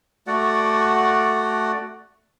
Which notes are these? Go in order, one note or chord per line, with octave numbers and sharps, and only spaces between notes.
A3 F#4 D5 F#5